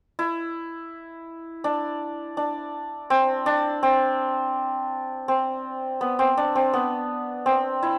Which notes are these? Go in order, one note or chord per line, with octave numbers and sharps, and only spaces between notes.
E4
D4
D4
C4
D4
C4
C4
B3
C4
D4
C4
B3
C4
E4